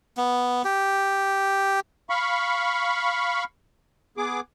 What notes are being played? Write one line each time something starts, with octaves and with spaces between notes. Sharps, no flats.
B3
G4
F5 B5 C#6
B3 G#4 D6